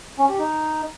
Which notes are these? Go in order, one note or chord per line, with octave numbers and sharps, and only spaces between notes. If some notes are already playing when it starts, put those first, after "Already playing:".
C#4
G4
D#4